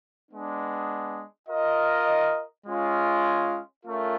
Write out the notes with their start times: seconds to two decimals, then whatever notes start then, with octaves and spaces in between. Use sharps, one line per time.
0.29 G#3 B3 D4
1.48 F4 A#4 D#5
2.66 G#3 C#4 F4
3.84 A3 C#4 F4 A#4